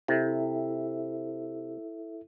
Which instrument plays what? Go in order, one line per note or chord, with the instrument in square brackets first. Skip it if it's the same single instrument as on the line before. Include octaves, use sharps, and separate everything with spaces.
[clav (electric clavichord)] C3 [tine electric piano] E4 A4 E5